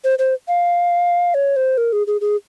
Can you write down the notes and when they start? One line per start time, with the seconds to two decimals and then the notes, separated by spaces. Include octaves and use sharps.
0.04 C5
0.19 C5
0.48 F5
1.34 C#5
1.56 C5
1.78 A#4
1.93 G#4
2.07 G#4
2.21 G#4